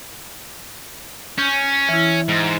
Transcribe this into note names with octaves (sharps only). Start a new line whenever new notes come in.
C#4 G6
E3 E4
G#2